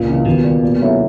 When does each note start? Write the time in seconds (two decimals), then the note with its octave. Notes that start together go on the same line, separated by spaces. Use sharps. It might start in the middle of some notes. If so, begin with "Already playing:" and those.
Already playing: C#2 A#2
0.08 C#3 E3
0.26 D#2 B2
0.44 D#3 G3
0.62 A#2
0.80 F#3 A3 C#4 E4